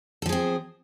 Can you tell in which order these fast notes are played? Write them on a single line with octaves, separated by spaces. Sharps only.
A4 F3 G#4 C4